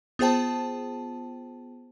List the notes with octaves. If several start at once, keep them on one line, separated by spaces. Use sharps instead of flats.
B3 F4 G#4 C5 G5 A5